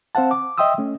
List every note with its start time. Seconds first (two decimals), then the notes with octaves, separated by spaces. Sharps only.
0.15 C4 C5 F5 F#5 A5
0.31 D6
0.58 D#5 E5 G5 C6 D#6 E6
0.78 A3 C#4